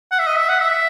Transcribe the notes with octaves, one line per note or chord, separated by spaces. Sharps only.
F#5
E5
D#5
E5
F#5
E5